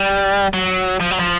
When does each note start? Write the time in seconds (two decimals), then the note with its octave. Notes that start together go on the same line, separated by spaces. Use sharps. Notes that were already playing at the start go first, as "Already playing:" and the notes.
Already playing: G3
0.53 F#3
1.00 F3
1.11 F#3
1.20 F3